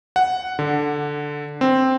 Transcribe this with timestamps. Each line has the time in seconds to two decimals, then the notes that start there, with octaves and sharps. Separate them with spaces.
0.16 F#5
0.59 D3
1.61 C4